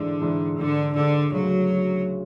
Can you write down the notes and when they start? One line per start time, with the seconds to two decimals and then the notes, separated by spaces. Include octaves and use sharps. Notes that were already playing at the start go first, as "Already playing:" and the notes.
Already playing: G#2 D3 E3 G#3 D4
0.21 G#2 E3 G#3 D4
0.58 G#2 D3 G#3 D4
0.95 G#2 D3 G#3 D4
1.32 D2 C#3 F#3 G#3 C#4